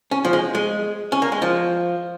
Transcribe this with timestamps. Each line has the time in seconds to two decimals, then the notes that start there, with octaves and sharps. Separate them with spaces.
0.11 C#4
0.25 F3
0.33 G#3
0.55 G#3
1.12 C#4
1.22 A#3
1.32 G#3
1.42 F3